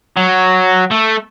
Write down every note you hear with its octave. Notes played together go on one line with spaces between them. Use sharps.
F#3
A3